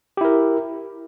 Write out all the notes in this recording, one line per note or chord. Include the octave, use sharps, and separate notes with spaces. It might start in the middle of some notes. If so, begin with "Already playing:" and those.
E4 G4 A#4